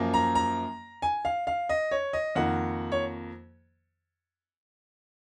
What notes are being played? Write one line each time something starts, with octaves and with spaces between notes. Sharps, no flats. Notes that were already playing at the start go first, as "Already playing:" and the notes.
Already playing: F#2 F3 A#3
A#5
A#5
G#5
F5
F5
D#5
C#5
D#5
F2 D#3 A#3 F#5
C#5